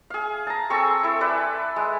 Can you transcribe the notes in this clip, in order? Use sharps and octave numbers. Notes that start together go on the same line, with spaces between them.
G#4 F5
A5 A#5
C4 G#4 A4 C#6
E4 A4
B4 D5 E5
G#3